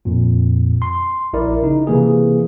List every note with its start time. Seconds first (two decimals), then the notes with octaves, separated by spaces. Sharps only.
0.05 F2 A#2
0.82 C6
1.33 A#1 E4 A#4 D5
1.62 C#3 D#4
1.87 C3 E3 A#3 G#4